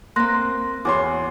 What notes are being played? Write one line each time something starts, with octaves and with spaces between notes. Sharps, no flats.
A#3 C4 C6 F#6 A#6
E2 F#4 C#5 C6 D6